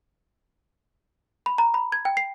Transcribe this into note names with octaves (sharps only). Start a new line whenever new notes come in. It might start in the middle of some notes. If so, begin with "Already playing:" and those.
B5
A#5
B5
G#6
G5
C7